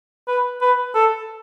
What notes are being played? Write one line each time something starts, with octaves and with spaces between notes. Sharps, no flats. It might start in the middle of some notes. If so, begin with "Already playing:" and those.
B4
B4
A4